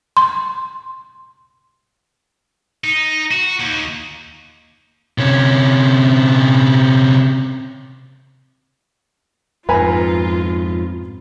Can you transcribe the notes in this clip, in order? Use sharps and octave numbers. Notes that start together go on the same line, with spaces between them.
C6
D#4
F#4
D#2
C3 C#4
F2 G#2 F4 B4 G#5 A#5